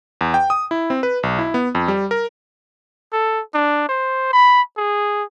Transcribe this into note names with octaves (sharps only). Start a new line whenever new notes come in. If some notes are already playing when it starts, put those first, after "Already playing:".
E2
G5
D#6
E4
C4
B4
B1
E4
B3
F2
G3
A#4
A4
D4
C5
B5
G#4